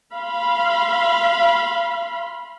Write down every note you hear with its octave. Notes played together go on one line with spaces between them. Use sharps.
F5 B5 C6